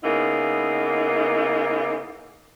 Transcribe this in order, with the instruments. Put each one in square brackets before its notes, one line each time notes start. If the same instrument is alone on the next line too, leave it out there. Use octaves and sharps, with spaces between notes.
[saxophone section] C#3 A#3 B3 D#4 E4